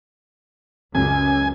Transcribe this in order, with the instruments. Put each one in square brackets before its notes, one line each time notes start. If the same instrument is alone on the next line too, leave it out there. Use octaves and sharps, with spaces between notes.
[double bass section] C#2 [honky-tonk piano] F#2 [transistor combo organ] G#5